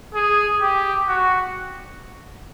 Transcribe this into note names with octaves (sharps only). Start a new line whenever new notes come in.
G#4
G4
F#4